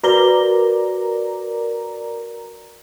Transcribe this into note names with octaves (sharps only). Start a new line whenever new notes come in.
F#4 A#4 B4 D5 A#5 G7